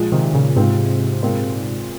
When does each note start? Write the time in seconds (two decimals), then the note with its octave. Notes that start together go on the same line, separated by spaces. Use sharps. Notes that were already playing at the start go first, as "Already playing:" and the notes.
Already playing: A#2 F3 G#3
0.12 C3 D#3
0.33 A#2 C#3
0.56 G#2 C3 G#3 C4 F4
1.23 A#2 G#3 C4 F4 A#4